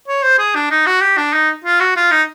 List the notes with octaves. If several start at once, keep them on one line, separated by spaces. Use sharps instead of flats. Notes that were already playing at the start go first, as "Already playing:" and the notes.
C#5
C5
G#4
D4
D#4
F#4
G4
D4
D#4
F4
F#4
F4
D#4